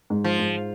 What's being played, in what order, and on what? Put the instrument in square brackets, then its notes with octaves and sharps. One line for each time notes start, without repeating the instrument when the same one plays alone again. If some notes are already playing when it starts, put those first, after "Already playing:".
[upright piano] G#2
[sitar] F3
[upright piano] G#2